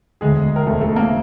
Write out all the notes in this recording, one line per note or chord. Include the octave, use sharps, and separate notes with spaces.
E1 D2 D3 G#3 G#4
A#4
E1 D2 D3 A3 A4
A3 A4
A#3 A#4